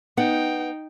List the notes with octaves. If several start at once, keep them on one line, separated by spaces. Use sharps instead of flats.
B3 D#4 F#5 G5